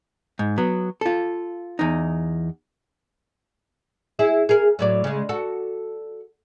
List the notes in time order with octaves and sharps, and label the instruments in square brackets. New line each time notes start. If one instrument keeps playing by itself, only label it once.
[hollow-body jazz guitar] G#2
F#3 B3
F4 A4
E2 D#4
[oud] E4 G#4 E5
G#4 A#4
A2 F#3 D5
C#3 G#3
F#4 A4